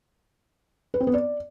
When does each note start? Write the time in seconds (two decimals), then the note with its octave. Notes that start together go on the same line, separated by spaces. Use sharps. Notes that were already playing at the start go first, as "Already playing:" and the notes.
0.94 B4
1.00 C4
1.07 B3
1.14 D5